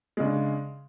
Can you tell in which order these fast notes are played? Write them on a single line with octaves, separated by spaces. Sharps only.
G#3 C#3 D4